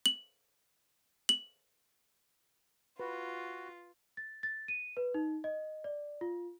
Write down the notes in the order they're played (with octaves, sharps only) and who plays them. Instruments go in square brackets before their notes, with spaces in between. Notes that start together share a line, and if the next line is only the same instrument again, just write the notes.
[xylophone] F#7
F#7
[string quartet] F4 [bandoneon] F#4 [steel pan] B4
[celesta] A6
A6
D#7
B4
D#4
D#5
D5
F4